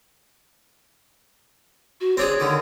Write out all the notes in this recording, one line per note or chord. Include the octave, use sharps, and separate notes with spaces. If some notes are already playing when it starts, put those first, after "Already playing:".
F#4
C4 D4 G#4 C#5
D#2 D3 D#3